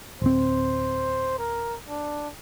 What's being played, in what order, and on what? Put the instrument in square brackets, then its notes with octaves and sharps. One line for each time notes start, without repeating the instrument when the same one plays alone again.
[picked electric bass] D1 C4 [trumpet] C5
[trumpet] A#4
D4